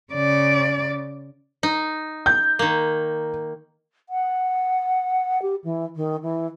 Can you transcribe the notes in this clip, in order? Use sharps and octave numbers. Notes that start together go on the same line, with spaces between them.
C#3 D5
D#4
G6
D#3 A#3
F#5
G4
E3
D#3
E3